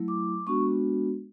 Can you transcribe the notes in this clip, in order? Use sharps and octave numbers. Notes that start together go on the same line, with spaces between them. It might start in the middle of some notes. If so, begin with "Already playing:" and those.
Already playing: F#3 A3 E4
D6
G#3 B3 D4 F#4 C#6